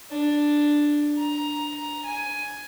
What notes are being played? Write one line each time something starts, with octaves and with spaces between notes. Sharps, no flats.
D4
A#5
G#5